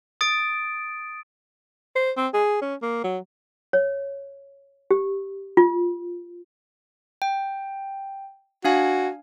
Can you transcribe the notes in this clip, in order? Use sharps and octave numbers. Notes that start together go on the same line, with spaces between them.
D#6 A6 D7
C5
C4
G#4
C#4
A#3
F#3
C#5
G4
F4
G5
D4 F#4 F5 G#5